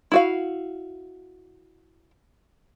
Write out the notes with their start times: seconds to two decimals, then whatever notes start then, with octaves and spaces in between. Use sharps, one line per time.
0.12 E4 F#4 F5